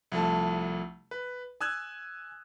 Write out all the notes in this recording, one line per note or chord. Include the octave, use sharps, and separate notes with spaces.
C2 F3 A3 A5
B4
G#5 D#6 E6 F#6 G#6